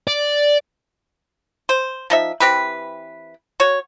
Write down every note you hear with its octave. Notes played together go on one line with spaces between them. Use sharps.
D5
C5
F3 D#4 E5
E3 C4 G4 B4
F#4 C#5